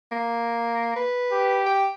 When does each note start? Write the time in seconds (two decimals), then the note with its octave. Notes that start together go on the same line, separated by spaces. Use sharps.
0.11 A#3
0.96 B4
1.33 G4
1.66 G5